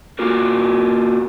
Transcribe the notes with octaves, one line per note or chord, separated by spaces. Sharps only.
A#3 F4 F#4 A#4